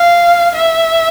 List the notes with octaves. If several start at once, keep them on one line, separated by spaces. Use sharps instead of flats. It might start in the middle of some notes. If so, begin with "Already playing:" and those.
Already playing: F5
E5